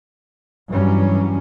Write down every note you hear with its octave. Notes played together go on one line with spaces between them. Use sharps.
G2 E3 F#3 G3 C#4